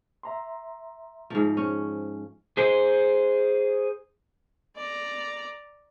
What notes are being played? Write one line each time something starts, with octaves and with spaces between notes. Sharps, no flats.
E5 A#5 C6
G#2 F3
C#4
G#4 C5
D5 A#5